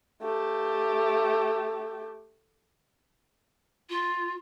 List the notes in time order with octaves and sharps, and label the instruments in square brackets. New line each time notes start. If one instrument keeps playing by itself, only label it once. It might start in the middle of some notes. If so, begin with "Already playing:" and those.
[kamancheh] A3 G4
[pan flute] F4